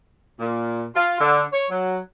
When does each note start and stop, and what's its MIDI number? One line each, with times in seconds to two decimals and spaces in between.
0.40 0.85 46
0.96 1.16 65
1.20 1.43 50
1.52 1.66 73
1.71 1.98 54